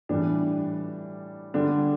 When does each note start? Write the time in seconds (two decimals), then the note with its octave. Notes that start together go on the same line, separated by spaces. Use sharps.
0.09 A2 E3 G3 D4
1.54 D3 G3 D4